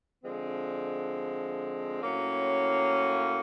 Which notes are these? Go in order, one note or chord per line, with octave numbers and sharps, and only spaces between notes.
D3 F3 G#3 C4
A2 F#3 A#3 C#4